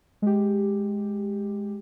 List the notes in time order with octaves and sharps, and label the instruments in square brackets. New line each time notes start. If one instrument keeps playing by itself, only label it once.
[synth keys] G#3 G4